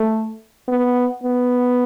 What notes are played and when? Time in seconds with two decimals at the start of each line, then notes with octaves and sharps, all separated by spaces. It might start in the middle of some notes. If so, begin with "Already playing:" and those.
Already playing: A3
0.68 B3
1.23 B3